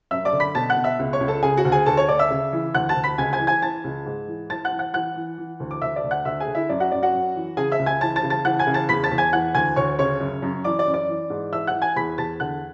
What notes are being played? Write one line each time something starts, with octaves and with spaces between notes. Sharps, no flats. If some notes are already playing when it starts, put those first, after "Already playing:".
F#2 E5 E6
D5 D6
D3
B5 B6
B2 A5 A6
F#5 F#6
B2
E5 E6
C#2
C#5 C#6
C#2
A4 A5
C#3 G#4 G#5
F#4 F#5
D2
G#4 G#5
D2 A4 A5
C#5 C#6
D2 D5 D6
E5 E6
C#3
E3
D2 F#5 F#6
A5 A6
D2
B5 B6
C#2 G#5 G#6
G#5 G#6
E3
G#5 G#6
E3 A5 A6
C#2
G#2
E3
E3 A5 A6
F#5 F#6
E3
F#5 F#6
E3 F#5 F#6
E3
E3
D2
D6
D2 E5 E6
D5 D6
D2
F#5 F#6
D2 E5 E6
G#4 G#5
D3
E4 E5
F#2 D5
F#4 F#5
F#2 D5
F#4 F#5
F#2
E3
C#3 G#4 G#5
E5 E6
C#2
G#5 G#6
E3 A5 A6
A5 A6
C#3
A5 A6
E3 F#5 F#6
G#5 G#6
C#3
A5 A6
E2 B5 B6
A5 A6
E2
G#5 G#6
E3 F#5 F#6
D2 G#5 G#6
D2 C#5 C#6
C#3 C#5 C#6
F#2
F#2
E3 D5 D6
D5 D6
F#2
D5 D6
E3
G#2
E3 E5 E6
F#5 F#6
E3
G#5 G#6
E2 B5 B6
E2 A5 A6
D3 F#5 F#6